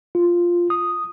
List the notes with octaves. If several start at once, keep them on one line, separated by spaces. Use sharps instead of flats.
F4
D#6